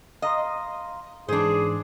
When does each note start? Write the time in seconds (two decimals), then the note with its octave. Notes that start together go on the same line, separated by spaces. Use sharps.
0.22 D#5 F5 A#5 C6
1.28 G#2 E3 D4 G#4 C5